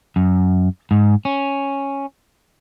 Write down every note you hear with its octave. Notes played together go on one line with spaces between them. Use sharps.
F#2
G#2
C#4